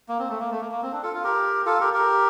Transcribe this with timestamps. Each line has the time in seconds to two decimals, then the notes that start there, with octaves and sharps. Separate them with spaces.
0.09 A#3
0.19 C4
0.29 A3
0.40 A#3
0.51 A3
0.61 A#3
0.72 A#3
0.82 C4
0.92 D4
1.03 F4 A4
1.14 F4
1.24 G4 A#4
1.66 F4 A4
1.80 G4 A#4
1.94 G4 A#4